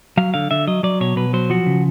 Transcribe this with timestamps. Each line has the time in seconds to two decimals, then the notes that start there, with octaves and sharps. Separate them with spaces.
0.17 F#3 F5
0.34 D3 F5
0.51 D3 E5
0.67 F#3 D#5
0.83 F#3 D5
1.01 B2 C#5
1.16 B2 B4
1.33 F#3 C5
1.50 F3 F#4
1.66 C#3